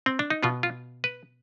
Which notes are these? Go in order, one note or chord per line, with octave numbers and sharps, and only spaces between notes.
C4
D4
D#4
B2 B3 F4
F4
B4